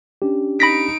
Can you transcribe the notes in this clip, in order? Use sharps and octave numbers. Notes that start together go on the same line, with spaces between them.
C#4 D4 G4
D#4 B5 A#6 B6 D7